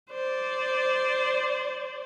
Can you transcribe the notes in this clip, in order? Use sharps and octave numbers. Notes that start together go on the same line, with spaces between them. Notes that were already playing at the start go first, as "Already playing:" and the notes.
C5 D5